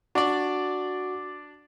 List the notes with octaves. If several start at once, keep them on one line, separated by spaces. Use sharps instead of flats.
D4 F#4 D5